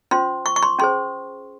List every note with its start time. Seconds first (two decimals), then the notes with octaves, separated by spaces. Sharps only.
0.11 C#4 F4 C5 C6
0.46 C#6
0.56 C#6
0.63 C6
0.79 C#4 G#4 C5 C6